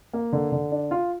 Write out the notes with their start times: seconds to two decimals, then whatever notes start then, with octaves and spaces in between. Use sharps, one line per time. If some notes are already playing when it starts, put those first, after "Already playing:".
0.13 A#3
0.33 D3
0.52 D3
0.72 D4
0.91 F4